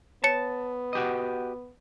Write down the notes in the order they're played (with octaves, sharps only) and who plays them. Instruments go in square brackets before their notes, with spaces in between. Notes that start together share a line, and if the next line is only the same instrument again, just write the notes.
[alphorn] B3 [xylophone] C#5 C#7 [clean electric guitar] A5
[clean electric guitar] F#4 G4 D#5